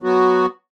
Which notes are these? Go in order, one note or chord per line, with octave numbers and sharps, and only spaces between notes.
F#3 B3 F#4